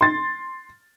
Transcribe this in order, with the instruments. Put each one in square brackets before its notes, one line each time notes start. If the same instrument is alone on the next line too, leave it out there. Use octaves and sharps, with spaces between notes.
[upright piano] C6 A6